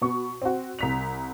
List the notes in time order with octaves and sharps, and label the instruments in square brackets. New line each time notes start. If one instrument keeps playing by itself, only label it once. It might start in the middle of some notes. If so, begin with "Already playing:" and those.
[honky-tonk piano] B2 B3 C#6
C4 F#4
C2 B6 F7